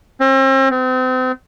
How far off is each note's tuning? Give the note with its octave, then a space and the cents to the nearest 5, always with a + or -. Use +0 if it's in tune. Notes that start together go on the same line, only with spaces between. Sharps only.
C4 +40
C4 -35